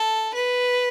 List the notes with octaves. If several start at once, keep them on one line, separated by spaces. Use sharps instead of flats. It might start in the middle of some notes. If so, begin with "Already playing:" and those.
Already playing: A4
B4